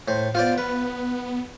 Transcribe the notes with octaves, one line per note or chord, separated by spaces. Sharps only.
A2 C5
B3 F4 C5 D5
B4